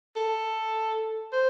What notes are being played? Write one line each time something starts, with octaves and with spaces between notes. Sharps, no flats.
A4
C5